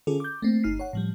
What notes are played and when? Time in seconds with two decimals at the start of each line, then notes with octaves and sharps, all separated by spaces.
0.07 D3 C#4 F4 G#4 A4
0.20 D6 G6
0.42 A3 A#3 C4
0.63 G1 D#4 F6 C7
0.80 C#5 F#5
0.93 A2 F3 G3